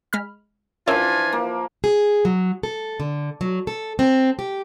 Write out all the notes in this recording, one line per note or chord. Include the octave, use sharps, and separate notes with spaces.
G#3 B5 F6
E3 F3 C#4 D4 F4 A#4 E5 G#5
A#3
G#4
F#3
A4
D3
F#3
A4
C4
G4